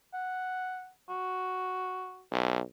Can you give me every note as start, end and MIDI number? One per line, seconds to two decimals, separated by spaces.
0.14 0.90 78
1.09 2.23 66
2.31 2.60 35